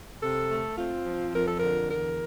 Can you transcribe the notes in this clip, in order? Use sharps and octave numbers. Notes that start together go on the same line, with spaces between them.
C3 A4
A3
C4 F4
F3
F2 A#4
A4
D3 A#4
E2 A#4